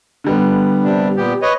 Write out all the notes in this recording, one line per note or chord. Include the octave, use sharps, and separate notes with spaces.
D3 G3 B3
C3 D4
A#2 B3 G4
B4 C#5 D#5